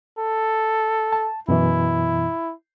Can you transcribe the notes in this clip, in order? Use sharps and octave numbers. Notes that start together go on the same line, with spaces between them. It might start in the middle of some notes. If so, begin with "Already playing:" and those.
A4
A5
F#2 B2 E3 E4